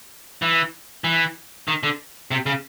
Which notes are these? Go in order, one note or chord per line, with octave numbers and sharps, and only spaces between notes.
E3
E3
D#3
D3
C3
C#3